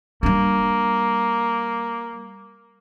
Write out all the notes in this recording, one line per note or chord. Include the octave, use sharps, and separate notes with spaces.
G3 A#3 D4